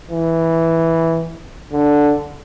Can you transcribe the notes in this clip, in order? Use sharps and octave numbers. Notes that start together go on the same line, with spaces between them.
E3
D3